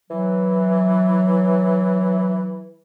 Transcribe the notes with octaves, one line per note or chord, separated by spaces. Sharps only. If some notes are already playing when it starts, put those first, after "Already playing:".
E3 F#3